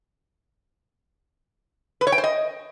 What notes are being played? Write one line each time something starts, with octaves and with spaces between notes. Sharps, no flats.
B4
C#5
G5
C5
D#5